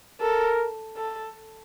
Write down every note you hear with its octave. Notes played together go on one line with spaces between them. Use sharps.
A4 A#4
A4